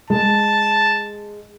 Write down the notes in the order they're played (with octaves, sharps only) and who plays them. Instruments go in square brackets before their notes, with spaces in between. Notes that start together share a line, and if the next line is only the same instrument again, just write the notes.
[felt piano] G#3 [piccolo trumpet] A5